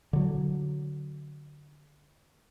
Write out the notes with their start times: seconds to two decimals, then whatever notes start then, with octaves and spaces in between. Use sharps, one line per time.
0.13 D3 F#3